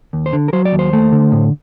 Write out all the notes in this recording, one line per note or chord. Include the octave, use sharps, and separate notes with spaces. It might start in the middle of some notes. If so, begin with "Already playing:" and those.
D#2
C5
D3
A#4
F#3 C5
D5
D#2
C5
A3
D3
A2